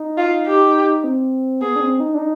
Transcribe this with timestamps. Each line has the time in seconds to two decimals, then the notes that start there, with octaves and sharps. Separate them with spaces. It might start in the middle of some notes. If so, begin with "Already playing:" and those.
Already playing: D#4
0.18 F4
0.47 G4
1.04 C4
1.61 B3 G#4
1.76 D4
1.81 C4
2.00 D#4
2.14 D4
2.18 D#4